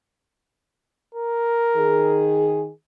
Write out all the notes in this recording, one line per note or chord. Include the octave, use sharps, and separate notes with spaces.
A#4
D#3 G#4